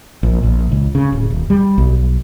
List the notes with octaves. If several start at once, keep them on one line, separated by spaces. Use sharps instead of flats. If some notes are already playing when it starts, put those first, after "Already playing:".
A#1
A#1
C#2
C#3
D1
D#1
G3
B1